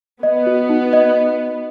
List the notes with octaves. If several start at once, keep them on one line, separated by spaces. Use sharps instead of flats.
B3 D#5
F#4
D#4
D#5